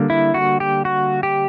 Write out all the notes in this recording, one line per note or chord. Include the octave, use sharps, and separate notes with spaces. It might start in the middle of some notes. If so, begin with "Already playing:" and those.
Already playing: D3 G3 A#3 D4
E4
F#4
G4
F#4
G4